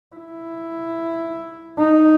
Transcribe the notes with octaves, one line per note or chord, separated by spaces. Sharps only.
E4
D#4